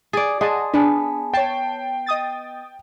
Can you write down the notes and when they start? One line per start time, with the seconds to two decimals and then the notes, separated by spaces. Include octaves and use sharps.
0.13 G#4 D5 A6
0.41 G#4 D#5 F#5 A5 C6
0.74 B3 D4 G#4 G#5 A5
1.34 C#5 G5 A5 C7
2.06 D#5 D#6 A6